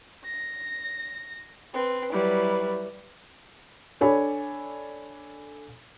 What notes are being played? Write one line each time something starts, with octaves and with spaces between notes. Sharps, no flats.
A#6
C4 B4
F#3 G3 E4 B4
D4 A4 C#5 D5 G#5 B5